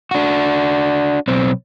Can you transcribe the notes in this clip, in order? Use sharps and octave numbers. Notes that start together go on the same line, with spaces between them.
D4 F#4
B1 C4